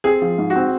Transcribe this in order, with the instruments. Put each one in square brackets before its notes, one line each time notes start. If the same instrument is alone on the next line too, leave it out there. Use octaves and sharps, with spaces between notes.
[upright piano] C4 [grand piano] G#4
[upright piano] F3
G#2
[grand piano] F#4
[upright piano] C4